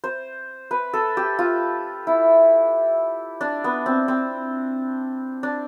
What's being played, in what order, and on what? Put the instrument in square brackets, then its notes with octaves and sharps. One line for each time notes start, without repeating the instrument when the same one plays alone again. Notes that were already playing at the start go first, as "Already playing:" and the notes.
[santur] C5
B4
A4
G4
F4
E4
D4
B3
C4
C4
D4